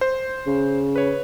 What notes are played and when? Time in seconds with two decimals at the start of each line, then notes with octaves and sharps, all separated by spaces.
0.01 C5
0.46 C#3
0.96 B4 C#5